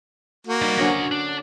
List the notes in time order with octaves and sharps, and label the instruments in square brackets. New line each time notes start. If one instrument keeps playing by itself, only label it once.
[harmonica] A#3 F#4
[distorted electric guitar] G3 [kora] D#4
[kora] D3 F#3 C#4 [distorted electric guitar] C#5 D#5
[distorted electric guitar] D4